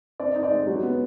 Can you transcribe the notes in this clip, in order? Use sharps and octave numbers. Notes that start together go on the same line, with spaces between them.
C4 D5
D#4 D#5
D5
G#3
F#3
B3